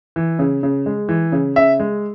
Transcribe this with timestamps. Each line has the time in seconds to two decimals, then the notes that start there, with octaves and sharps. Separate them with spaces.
0.16 E3
0.39 C#3
0.63 C#3
0.86 G#3
1.09 E3
1.32 C#3
1.56 C#3 E5
1.80 G#3